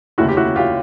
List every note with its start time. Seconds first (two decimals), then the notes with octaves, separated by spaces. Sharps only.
0.18 F1 D#2 C#3 E4 F#4
0.28 G4
0.37 E4 F#4
0.56 F4 G4